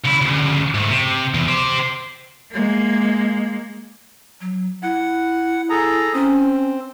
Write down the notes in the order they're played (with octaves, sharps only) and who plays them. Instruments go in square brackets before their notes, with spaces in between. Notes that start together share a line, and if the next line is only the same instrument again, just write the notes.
[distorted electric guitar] C#2 E4
D2 C#3
G#2 A3
C3
E2
G4 C5
[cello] G#3 A#3
[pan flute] F#3
[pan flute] E4 [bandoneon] F#5
[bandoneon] G#4 A4 A#5
[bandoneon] C4 [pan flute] C#4